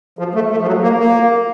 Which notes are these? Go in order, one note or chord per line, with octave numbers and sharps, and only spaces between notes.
F3
A3
A3
F3
F#3
A#3
A#3